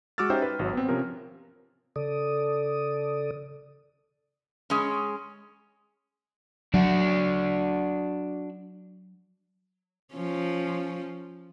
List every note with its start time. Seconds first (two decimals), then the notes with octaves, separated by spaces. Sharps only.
0.18 G#3 F#4 D6 E6 F6 A6
0.30 C#4 D#4 G4 C5 E5 G5
0.42 B4
0.59 G#1 F#3
0.73 B3 C4
0.88 C3 F3 C#4 F4 A#4
1.96 C#3 A4 D5 D#6
4.70 G#3 C#4
6.74 F#3 D4 F#4
10.15 F3 C#4